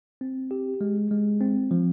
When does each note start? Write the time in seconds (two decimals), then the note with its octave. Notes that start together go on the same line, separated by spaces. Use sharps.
0.21 C4
0.51 G4
0.81 G#3
1.11 G#3
1.41 C4
1.71 F3